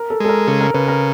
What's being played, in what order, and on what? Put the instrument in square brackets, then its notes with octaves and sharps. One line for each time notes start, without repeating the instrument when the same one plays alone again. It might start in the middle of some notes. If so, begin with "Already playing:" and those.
Already playing: [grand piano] A#4
A4
[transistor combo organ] G#3 [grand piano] A4
[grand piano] A#4
[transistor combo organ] C#3 [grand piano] A4
[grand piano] A#4
[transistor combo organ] C#3 [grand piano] B4
[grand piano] A#4